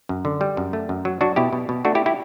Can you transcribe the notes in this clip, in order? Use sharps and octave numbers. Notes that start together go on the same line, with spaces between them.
F#2
D3
G3
F#2
A3
F#2
F#3
F#3 D4 F#4
B2 E4 G4
B2
B2
A3 D4 F#4
E4 G4
E4 G4